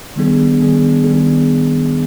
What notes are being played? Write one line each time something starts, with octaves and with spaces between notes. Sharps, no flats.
D#3 G3 B3 D4 G#4
D#3 G3 B3 D4 G#4
D#3 G3 B3 D4 G#4